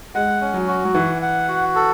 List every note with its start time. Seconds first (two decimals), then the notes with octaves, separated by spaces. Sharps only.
0.15 G#3 F#5
0.41 C#4
0.54 F#3
0.68 F#4
0.85 F#3
0.94 E3 F#5
1.22 F#5
1.49 F#4
1.75 A4